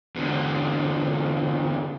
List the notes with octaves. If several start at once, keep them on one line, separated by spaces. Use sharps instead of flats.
E2 D3